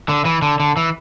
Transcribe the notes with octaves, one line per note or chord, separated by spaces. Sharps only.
D3
E3
D3
D3
E3